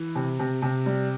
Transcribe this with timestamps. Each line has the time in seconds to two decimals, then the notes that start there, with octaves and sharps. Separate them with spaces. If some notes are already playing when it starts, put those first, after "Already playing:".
Already playing: E3
0.15 C3
0.40 C3
0.62 C3
0.86 G3